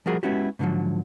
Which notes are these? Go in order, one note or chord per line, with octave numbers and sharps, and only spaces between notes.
F3 G3 F4 F#4 G#4 A#4
G#3 B3 C#4 E4 F#4 G4
G#2 B2 D3 D#3 F3 F#3